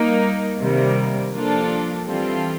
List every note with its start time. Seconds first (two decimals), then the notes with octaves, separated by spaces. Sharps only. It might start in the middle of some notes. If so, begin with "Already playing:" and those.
Already playing: G3 A#3 D#4
0.60 C3 D#3 G3 A#3
1.33 F3 A#3 D4 F4 A4
2.05 E3 G3 C4 F4 A4